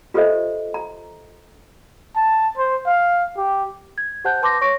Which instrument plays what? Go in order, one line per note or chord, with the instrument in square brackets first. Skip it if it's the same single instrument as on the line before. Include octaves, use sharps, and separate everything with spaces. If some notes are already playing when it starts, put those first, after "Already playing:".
[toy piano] F4 G4 A4 C5 D#5 E5
A#5
[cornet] A5
C5
F5
G4
[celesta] G#6
G4 C5 F#5 A5 F#6 G6
B4 A5 C6 D6 G6 A#6
C#5 C#6 A#6 D7